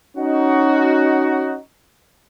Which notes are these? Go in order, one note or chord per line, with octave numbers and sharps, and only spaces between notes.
C#4 D#4 F#4